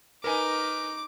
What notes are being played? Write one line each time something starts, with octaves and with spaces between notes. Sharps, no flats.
D#4 A#4 B4 G#5 D6